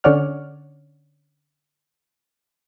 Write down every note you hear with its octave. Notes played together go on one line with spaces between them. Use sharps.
D3 C#4 C#5 D5 F#5 F6